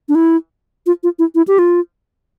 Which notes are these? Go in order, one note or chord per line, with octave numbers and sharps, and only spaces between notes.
D4
E4
F4
F4
E4
E4
G4
F4